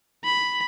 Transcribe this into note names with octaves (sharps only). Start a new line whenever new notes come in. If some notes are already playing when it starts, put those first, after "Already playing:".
B5